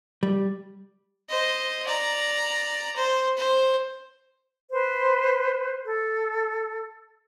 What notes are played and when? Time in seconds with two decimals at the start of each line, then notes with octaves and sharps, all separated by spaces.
0.23 G3
1.30 C5 D#5
1.87 D5 A#5
2.96 C5
3.38 C5
4.72 B4 C5
5.84 A4